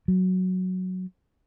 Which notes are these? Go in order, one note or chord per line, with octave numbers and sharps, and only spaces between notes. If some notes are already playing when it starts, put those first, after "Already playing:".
F#3